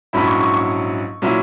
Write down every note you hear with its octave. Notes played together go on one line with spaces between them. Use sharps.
A#1 G#2 F#3 C#4 E4 B5
C#6
C#6
C#6
A#2 F#3 C#4 E4